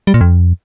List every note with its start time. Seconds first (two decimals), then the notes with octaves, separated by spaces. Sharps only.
0.07 G3
0.14 A#2
0.21 F2